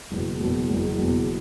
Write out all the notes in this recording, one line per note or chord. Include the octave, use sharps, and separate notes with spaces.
F#1 E2 B2
F#1 E2 B2
F#1 E2 B2
F#1 E2 B2